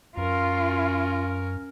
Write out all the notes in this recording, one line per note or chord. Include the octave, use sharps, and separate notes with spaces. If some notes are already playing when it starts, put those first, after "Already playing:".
F#2 C#4 F4 A#4